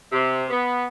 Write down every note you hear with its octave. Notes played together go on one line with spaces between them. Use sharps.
C3
B3